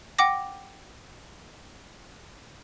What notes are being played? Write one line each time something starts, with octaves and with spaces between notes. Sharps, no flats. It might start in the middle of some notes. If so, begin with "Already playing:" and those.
F#5 G5 D6 A#6